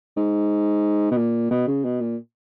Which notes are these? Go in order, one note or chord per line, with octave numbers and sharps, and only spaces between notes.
G#2
B2
A#2
B2
C#3
B2
A#2